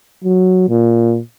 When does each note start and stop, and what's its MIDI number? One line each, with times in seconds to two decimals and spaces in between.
0.24 0.66 54
0.69 1.19 46